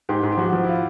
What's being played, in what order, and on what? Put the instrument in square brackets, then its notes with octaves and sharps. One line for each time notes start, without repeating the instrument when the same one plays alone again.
[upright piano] G#2 [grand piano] G4
[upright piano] G#2
[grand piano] G4
[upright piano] F3 [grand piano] F#4
[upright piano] F3
[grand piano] E4
F4